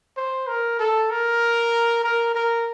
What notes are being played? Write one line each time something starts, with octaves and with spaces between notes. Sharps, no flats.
C5
A#4
A4
A#4
A#4
A#4